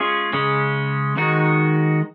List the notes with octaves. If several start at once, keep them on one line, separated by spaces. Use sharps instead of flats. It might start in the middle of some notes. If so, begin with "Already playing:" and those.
Already playing: G#3 C#4 F4 G#4 C#5
C#3 G#3 C#4
D#3 G#3 D#4 F#4